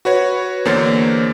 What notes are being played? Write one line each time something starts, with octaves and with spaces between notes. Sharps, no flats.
F#4 B4 C#5
E2 D3 A#3 C5 C#5 A6